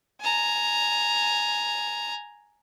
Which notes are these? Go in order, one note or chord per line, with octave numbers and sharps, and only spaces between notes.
G#5 A#5